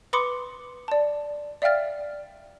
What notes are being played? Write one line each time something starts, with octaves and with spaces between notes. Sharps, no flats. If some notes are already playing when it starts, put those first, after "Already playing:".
B4 B5 C6 D6 D#6 C#7
D5 A5
D5 E5 F5 G5 F6 A6